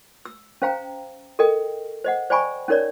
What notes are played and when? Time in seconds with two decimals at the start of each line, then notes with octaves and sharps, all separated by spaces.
0.25 E6
0.62 C#4 C5 F5 G5 A#5
1.39 A4 A#4 D#5 G5
2.04 C5 D#5 F#5
2.30 C5 D5 G5 G#5 B5 C#6
2.68 C#4 D#4 A#4 C#5 D5